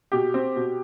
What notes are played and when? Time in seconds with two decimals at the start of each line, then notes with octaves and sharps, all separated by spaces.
0.12 B2 G4
0.34 C4
0.56 B2